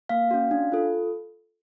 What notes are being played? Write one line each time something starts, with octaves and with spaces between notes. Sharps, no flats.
A#3 F5
C#4 F#4
D4
F4 A4